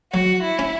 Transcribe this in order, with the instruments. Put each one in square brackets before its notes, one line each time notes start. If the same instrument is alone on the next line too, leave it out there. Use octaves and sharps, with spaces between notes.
[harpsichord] F#3 [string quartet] F#4
[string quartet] E4
[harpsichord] C#4